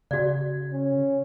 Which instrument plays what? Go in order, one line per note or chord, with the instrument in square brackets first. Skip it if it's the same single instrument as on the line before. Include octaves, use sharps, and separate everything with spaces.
[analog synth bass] C#3 [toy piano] F#4 D5
[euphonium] C#4